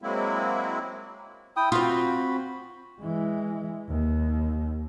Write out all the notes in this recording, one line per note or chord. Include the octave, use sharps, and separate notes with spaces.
F#3 G#3 A#3 C4 E4
E4 G5 D#6
C4 F4 F#4 B5
E3 G#3
D#2